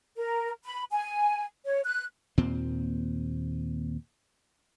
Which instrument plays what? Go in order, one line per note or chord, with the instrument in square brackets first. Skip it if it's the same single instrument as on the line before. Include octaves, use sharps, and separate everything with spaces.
[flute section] A#4
B5
G#5
C#5
F#6
[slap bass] D#2 A#2 C4